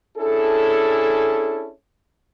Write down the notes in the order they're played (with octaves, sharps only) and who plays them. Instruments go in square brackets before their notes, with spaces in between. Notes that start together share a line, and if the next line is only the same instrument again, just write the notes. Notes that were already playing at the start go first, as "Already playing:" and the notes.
[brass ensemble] C#4 D4 E4 G#4 A4